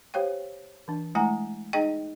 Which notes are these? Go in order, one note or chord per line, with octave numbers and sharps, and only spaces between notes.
G4 C5 C#5 F5 G5
E3 D4
G#3 A3 E4 F#5 G#5 A#5
D#4 G#4 D#5 G5